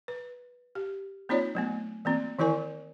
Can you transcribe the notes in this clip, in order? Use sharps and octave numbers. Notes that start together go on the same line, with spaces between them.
B4
G4
A#3 C4 D#4 F4 C#5 D5
F#3 A3 B3
E3 A#3 C4
D#3 E3 E4 A#4 G#5